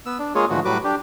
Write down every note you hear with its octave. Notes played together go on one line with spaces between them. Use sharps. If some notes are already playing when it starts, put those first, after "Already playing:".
B3 E6
D4
G#3 A#3 F4 G#4 C#5
G#2 D3 E3 F3 A3 F#4
A2 F#3 G3 F#4 B4 D6
D4 G4